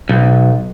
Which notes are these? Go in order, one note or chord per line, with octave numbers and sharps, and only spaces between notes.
B1